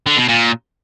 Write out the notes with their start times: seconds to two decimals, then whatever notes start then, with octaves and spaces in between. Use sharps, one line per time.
0.06 D3
0.17 B2
0.28 A#2